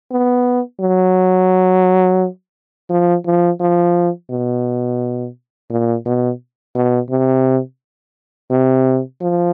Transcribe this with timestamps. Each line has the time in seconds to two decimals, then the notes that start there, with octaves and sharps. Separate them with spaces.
0.11 B3
0.80 F#3
2.90 F3
3.26 F3
3.61 F3
4.30 B2
5.70 A#2
6.06 B2
6.75 B2
7.10 C3
8.50 C3
9.21 F3